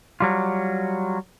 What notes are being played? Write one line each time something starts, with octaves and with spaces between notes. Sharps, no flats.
F#3 G3 F4